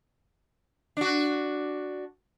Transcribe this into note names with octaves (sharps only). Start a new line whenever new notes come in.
D4 F#4